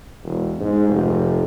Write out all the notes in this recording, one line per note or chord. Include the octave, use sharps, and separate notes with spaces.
E1
G#2
F1